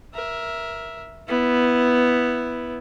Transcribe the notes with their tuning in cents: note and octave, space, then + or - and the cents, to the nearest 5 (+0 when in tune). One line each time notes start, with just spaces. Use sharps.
A#4 +15 E5 +0
B3 +0 E4 +0